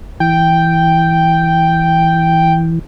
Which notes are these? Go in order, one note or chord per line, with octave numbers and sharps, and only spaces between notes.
E3 G5